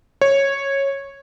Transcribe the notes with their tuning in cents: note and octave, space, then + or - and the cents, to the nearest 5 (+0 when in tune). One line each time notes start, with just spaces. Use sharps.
C#5 -10